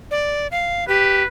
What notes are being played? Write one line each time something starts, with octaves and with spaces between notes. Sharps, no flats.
D5
F5
G4 B4